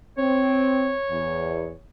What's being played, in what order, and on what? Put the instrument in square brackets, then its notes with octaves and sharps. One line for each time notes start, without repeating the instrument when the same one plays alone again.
[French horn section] C4 [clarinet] C#5
[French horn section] E2